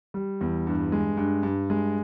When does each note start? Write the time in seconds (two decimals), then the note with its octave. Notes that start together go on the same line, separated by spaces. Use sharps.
0.14 G3
0.41 E2
0.67 G2
0.92 G#3
1.17 G2
1.43 G2
1.70 G#3